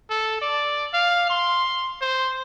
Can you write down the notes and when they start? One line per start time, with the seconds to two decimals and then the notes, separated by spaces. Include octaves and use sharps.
0.10 A4
0.42 D5
0.94 F5
1.30 C6
2.01 C5